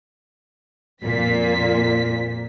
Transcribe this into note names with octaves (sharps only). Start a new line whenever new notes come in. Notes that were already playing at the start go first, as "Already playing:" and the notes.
F2 A#2 B6